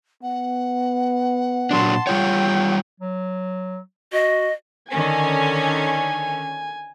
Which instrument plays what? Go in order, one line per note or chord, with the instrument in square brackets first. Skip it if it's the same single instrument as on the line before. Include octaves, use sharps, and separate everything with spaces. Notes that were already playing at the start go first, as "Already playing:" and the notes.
[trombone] B3 [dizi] F#5
[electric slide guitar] A#2 F#3 D4 [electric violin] A5 C6
[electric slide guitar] G3 F4 C#5 [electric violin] G5
[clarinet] F#3
[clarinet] F#4 [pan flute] D#5
[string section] D3 D#3 C#4 [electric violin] G#5